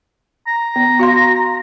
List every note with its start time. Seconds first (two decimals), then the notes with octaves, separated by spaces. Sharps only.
0.47 A#5
0.76 B3
0.99 F#4 F5 C6